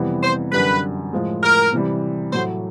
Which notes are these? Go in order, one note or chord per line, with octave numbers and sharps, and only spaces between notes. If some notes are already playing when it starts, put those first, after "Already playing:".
Already playing: F2 C3 E3 G3 B3
C5
F#2 D3 G3 B4
A2 F3 G#3
A#4
C3 E3 G3
A2 F#3 A3 C5